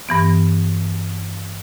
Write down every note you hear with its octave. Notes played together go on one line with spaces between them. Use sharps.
G2 E3 B3